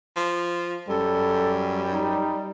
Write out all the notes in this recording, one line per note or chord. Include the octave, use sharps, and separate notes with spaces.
F3
F#2 G3 A4
D#4